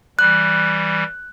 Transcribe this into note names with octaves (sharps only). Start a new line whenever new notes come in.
E3 G3 F#6